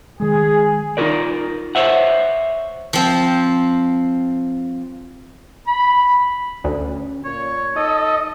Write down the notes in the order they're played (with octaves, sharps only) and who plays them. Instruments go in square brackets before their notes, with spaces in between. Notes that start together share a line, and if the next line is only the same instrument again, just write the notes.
[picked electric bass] D#3 G#3 [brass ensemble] G#4
[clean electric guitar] D#4 F4 F#4 G#4 A#4 D5
C5 C#5 E5 F#5
[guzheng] F3 C4
[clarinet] B5
[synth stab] D2 [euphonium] C#4
[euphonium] A#2 [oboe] C#5
[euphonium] D#4 [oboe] A4 [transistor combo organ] D#5